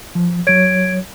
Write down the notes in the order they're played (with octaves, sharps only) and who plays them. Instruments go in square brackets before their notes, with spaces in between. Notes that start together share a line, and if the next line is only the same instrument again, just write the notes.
[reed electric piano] F3
[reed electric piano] F#3 C#5 [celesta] G#6 D7